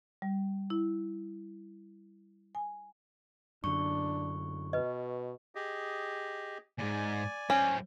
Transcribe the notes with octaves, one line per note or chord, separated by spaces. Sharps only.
G3
E4
G#5
F#2 D3 D4 C#6
B2 B4 D#5
G4 G#4 D#5
D#2 G#2 D5 G#5
F#3 C4 C#4